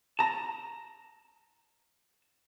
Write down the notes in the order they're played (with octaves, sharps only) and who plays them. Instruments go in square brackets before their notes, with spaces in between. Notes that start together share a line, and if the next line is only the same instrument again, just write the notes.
[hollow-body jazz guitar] A5 A#5